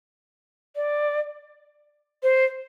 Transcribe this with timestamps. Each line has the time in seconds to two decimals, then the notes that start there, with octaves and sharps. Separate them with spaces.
0.76 D5
2.23 C5